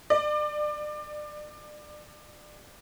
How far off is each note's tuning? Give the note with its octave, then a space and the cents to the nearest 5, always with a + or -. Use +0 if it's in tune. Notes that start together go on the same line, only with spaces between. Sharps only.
D5 +30